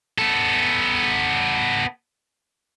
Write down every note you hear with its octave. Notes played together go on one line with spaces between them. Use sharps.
B3 A4